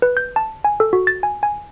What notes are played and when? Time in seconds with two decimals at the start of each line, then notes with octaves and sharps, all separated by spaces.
0.02 B4
0.17 G6
0.36 A5
0.65 G#5
0.80 A4
0.93 F#4
1.07 A6
1.23 G#5
1.43 G#5